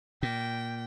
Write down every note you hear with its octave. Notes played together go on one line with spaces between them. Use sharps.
A#2 G5